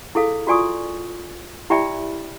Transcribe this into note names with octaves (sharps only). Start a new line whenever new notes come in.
E4 G#4 A4 F5
F4 F#4 D5 G#5 C#6 D#6
E4 G4 D5 E5 G5 B5